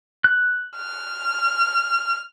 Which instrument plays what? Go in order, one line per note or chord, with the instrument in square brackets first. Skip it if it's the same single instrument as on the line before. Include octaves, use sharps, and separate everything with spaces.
[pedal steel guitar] F#6
[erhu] F6